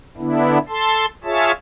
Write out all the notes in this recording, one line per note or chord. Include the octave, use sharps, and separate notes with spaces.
D3 B3 D4 E4
A4 A5 C6
F4 G#4 C#5 E5 A5